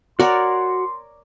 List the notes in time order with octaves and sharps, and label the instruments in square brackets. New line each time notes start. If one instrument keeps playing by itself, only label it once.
[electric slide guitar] F#4 F#5 [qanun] A#4 C#5 D5 [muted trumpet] C6